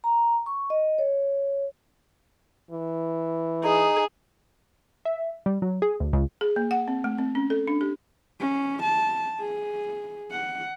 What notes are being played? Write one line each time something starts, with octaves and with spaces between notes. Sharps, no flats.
A#5
C#6
D#5
C#5
E3
D#4 G#4
E5
G3
F#3
G#4
D2
C#2
G#4
A#3
F#5
C4
A3
C4
C#4
A4
D4
G4
C#4
A5
G#4
F#5